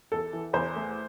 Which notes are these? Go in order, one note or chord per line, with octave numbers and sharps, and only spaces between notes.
E2 A4
E3
E2 C5
A3